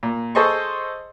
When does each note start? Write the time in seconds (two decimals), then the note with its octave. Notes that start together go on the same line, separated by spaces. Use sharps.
0.03 A#2
0.35 G#4 A4 C5 D#5 C6 C#6